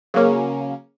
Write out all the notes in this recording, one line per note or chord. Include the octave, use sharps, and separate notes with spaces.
C#3 F#3 A#3 C#4